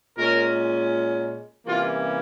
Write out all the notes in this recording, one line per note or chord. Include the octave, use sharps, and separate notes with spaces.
A#2 G#3 C#4 A#4
C3 E3 G3 A#3 C#4 F4